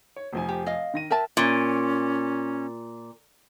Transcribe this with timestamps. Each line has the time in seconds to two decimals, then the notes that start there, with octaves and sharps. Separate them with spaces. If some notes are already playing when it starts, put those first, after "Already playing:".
0.16 C#5
0.33 F1 F3 G#5
0.49 G4
0.66 D#5 F5
0.94 D#3 A#6 D#7
1.10 A#4 E5 G5 A5
1.37 A#2 C#4